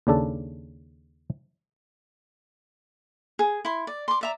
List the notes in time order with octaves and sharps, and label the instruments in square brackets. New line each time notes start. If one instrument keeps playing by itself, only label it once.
[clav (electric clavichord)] D#2 C#3 D4 A4
[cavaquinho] G#4
E4 C6
D5
C6 D6
D5 E5 A#5